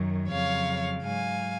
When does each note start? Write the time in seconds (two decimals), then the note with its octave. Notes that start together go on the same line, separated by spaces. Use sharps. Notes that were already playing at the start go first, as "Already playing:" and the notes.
Already playing: F#2 D#3 F#3
0.30 F2 C#3 F#3 C#5 F5
1.03 G#2 F#3 F5 G#5